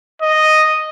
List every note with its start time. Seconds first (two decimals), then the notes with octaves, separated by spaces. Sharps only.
0.22 D#5